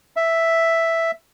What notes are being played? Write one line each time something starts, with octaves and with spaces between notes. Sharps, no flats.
E5